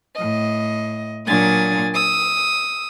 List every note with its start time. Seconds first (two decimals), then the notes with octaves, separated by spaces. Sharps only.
0.15 A2 D#5
1.27 A#2 F#3 D4 G#5 D#6 A6
1.93 D#6 E6